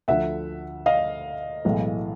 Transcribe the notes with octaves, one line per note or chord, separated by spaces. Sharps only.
D2 D3 F3 E5 F#5
D#5 F5
B1 A2 E3 G#3